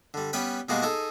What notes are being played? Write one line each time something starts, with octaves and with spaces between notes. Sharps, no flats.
D3 G3
G3 B3 C#4 B4 G5
B2 G3 G#3 A#3 F#4
D#4 G#4 A4